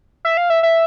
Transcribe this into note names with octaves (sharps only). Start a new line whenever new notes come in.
E5
F5
E5
E5